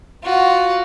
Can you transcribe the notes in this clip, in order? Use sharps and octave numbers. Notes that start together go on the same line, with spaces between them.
F4 F#4